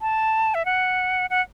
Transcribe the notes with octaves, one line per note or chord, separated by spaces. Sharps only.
A5
E5
F#5
F#5